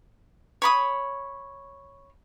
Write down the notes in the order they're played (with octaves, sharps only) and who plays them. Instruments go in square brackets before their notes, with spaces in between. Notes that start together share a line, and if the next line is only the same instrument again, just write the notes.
[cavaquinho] C#5 B5 D#6